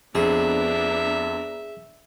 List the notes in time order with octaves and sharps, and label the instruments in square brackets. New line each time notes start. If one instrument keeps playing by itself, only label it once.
[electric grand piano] F2 [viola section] B3 D4 A#5 [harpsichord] G#4 [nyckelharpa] E5